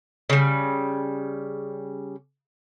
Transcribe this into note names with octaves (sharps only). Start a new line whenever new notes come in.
C#3 G3